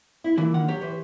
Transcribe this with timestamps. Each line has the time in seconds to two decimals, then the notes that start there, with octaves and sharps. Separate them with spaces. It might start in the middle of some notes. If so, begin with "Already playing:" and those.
0.24 E4
0.38 E3 A#3 E4 F4
0.54 D3 D#3 F#5
0.68 F#3 G4 C#5
0.81 E3 C5